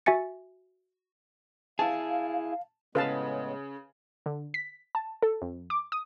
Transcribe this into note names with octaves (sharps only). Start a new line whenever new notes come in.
F#4 E5 G#5 A6 C#7
E4 G#4 F5 A5
A2 C#3 G#3 B3 B4 F5 A5
D3
B6
A5
A4
F2
D6
D#6